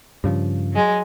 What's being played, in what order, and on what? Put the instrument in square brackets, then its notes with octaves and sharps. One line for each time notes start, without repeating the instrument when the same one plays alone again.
[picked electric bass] G2 C#3 F3
[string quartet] F#3 G#3